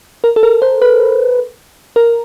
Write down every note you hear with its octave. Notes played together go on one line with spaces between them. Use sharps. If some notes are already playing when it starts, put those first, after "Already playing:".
A#4
A4
A#4
C5
B4
A#4